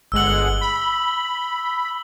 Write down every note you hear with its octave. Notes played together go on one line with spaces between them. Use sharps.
G1 G#3 F#5 E6 F#7
B5